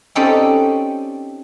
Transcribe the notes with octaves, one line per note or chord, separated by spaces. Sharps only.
C4 C#4 D#4 G4 A4 D5